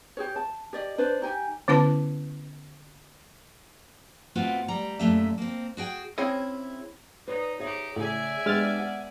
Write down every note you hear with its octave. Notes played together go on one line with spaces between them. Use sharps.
G4 G#4 C#5
A5
G4 D5 D#5
D4 B4 C5 D5
D#4 G4 G#5
D3 B3 C#4 E4 B4 A5
A2 B3 C4 F4 F#4
G3 A#5
F#2 A#2 A3 E5
A#3 C4
F#4 G#4 G5
C4 C#4 E4 G#4 D#5
D#4 B4 C#5 D5
D#4 G4 G#4 C#5 E5
A2 C#3 G#4 D5 E5 G#5
G#3 B3 D4 G4 F6 A6
F#5